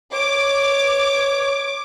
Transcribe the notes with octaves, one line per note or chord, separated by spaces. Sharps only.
C#5 D6